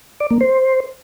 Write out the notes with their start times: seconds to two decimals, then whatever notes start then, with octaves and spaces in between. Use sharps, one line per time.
0.20 D5
0.31 A#3
0.41 C5